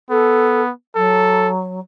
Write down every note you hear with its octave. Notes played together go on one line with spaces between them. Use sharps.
B3 A4
F#3 A4